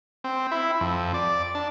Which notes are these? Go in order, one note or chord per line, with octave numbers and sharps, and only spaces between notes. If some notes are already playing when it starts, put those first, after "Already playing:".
C4
E4
F2
D5
D4